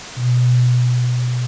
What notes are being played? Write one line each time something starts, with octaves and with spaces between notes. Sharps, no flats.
B2